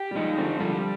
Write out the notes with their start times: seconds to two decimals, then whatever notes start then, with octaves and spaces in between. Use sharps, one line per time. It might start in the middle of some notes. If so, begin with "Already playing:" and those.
Already playing: G4
0.11 G3
0.15 F3 G#3 D#4
0.37 D3 F3 C4
0.60 D3 F3 G3